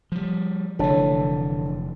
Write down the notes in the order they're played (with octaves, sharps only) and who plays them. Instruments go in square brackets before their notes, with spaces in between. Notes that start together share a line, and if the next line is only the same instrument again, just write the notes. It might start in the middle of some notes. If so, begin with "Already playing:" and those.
[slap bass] F3 G3
[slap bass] F1 E3 [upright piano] D3 C#5 A5